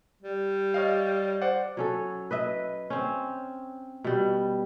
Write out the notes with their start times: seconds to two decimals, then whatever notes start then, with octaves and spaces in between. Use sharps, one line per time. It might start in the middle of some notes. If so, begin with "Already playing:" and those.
0.22 G3
0.74 C#5 D#5 F5
1.42 C5 D5 F#5
1.77 F#3 C#4 A4
2.31 B4 D#5 E5
2.90 C4 C#4
4.04 B2 G3